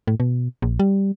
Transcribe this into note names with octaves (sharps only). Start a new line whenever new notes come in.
A2
B2
A#1
G3